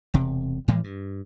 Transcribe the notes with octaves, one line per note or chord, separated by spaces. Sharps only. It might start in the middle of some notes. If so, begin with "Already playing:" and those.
E1 C3
A2 E3 F3 G#3
G2